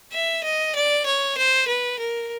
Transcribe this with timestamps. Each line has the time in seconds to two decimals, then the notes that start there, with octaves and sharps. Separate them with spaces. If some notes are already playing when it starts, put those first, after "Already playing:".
0.13 E5
0.44 D#5
0.75 D5
1.06 C#5
1.38 C5
1.68 B4
1.99 A#4